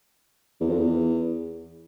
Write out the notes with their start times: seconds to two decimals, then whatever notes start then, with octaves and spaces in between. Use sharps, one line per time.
0.60 E2
0.70 F2
0.78 E2